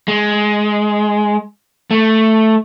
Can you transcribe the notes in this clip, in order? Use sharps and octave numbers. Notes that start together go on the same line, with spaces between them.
G#3
A3